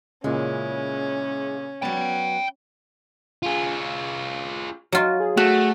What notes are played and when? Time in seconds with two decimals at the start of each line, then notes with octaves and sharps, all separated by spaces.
0.24 A#2 C#3 G#3 C#4 E4
1.82 F#3 B3 G5 B5
3.43 F4 G#4
4.92 F#3 F4 F#4
5.20 G#4
5.37 A3 F#4